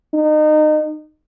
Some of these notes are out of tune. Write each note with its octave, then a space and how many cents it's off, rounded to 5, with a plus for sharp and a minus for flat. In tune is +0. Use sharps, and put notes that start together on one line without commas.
D#4 -30